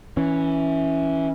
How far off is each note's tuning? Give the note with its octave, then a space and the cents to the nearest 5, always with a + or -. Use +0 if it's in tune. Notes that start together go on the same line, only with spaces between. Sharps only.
E3 -10 C#4 +0